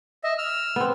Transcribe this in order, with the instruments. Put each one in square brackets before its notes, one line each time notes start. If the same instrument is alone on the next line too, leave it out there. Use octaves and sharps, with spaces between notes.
[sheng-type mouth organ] D#5 E5
E6 F6
[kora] B3 C4